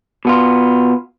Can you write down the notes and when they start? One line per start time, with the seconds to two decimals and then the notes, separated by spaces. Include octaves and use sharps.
0.25 B2 B3 F4